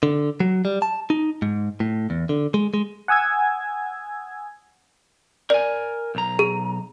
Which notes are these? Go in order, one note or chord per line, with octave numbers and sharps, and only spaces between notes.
D3
F#3
G3
A5
D#4
G#2
A2
E2
D3
G#3
G#3
F#5 G#5 D#6 E6 G#6
A#4 D5 G#5
B1 A#5
G#4